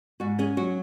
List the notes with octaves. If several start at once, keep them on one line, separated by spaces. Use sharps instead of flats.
G#2 F#4
C#4 G#4
F#3 F#4